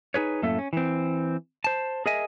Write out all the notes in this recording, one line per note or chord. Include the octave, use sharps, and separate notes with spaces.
D#4 G#4 B4 C#5
F#2 A2 A3 A#3 A4 E5
C#4
E3 C4
C5 A5
G#4 A#4 D#5 E5 G#5